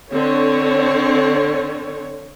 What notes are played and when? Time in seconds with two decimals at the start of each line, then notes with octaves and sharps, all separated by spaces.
0.11 D3 C4 C#5